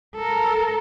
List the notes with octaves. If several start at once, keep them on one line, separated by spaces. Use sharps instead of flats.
A4 A#4